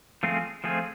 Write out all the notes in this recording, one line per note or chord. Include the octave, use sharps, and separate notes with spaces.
F3 A3 C4 F4 G#4
F3 A3 C4 F4 G#4